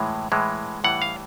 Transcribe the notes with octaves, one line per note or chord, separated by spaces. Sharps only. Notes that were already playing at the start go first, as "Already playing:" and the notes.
Already playing: A2 E3 G#3
A2 E3 G#3
A2 E3 G3 F#5
F5